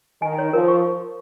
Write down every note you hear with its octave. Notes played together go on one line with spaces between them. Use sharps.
D#3 G#5
C#5
F3 A#4
C#6